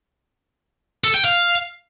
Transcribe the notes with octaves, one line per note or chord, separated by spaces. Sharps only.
A4
G5
F5